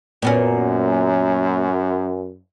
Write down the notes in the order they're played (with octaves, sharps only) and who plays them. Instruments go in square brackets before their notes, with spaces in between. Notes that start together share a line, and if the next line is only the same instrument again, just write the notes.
[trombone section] F#2 [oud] A#2 B3 C#4